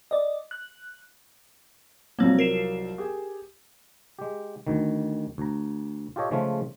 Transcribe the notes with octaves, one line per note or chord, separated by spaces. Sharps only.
D5 D#5
F#6
C2 F3 F#3 A#3 C4
A#4 C7 E7
G4 G#4
G#3 G4
D2 D#3
D2 A#5
F4 G4 A4 C#5 D#5
C#3 F3 G#3 A3 F4